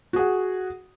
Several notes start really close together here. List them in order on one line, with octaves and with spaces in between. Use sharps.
F#4 G#4 F#5